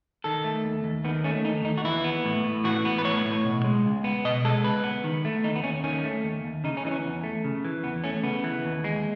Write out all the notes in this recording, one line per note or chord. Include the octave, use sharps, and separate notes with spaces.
D#3 A4
A3
D#2
D#2
D#3 B3
A3 C#4
D#2 D#4
D#2 D#4
F#4
E3 E4
B3
A2
A2
E3 F#4
B3
B4
A2 C#5
A2
B2
G#3
C#2
B3
B2 D#5
G#3 A4
C#2 B4
B3
D#3
A3
D#2 D#4
B3
D#2 C#4
D#3 C#4
A3
D#2
D#2
C#3 D#4
C#4
E3 D#4
C#4
E2
A3
C#3
E3
E2 B3
A3 C#4
C#3 B3
E3
D#2
G#3